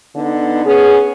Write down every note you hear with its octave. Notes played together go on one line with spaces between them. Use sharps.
D3 B3 D#4
B3 C#4 G#4